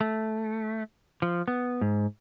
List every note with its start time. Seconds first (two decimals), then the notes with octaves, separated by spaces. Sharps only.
0.01 A3
1.22 F3
1.48 B3
1.81 G#2